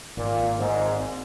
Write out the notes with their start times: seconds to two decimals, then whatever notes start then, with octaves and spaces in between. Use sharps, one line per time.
0.17 G#1 A#2
0.59 G#1 G#2